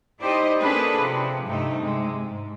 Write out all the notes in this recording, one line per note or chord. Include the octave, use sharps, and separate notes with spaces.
D#4 E4 G4 C5 D5 D#5
A#3 C#4 D4 G#4 A4 B4
C3 F3
G2 C3 A3 D#4
C3 G#3
G#2